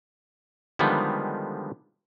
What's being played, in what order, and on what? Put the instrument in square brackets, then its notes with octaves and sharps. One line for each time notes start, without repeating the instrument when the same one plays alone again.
[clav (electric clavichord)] D3 D#3 F3 G3 G#3 B3